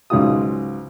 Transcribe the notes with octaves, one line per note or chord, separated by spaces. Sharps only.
C#2 G#2 F#3 F4 D#6